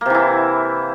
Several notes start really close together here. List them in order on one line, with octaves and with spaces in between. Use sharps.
A#3 C3 E3 E4